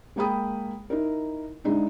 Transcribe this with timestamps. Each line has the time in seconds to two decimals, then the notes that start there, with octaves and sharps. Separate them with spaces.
0.16 G#3 A#3 G#4 G5 B5 D#6
0.90 D#4 E4 A#4
1.64 D3 G#3 D#4 E4